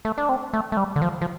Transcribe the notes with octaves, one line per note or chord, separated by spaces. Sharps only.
A3
D4
C4
A3
A3
G3
D3
F3
F3